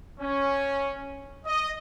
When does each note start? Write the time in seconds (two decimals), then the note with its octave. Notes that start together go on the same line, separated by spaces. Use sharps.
0.20 C#4
1.46 D#5